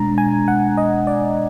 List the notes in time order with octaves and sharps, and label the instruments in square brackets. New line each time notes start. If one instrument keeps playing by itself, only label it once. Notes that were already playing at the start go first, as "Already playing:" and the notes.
Already playing: [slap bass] B2 G#3 D4 [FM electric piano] A#5
[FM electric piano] G#5
F#5
D#5
D5